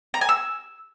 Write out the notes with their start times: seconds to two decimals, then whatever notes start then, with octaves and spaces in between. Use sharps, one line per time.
0.14 A#5
0.21 G#5
0.29 E6